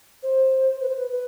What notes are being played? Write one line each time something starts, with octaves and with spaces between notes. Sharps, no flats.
C5
B4
C5
B4
B4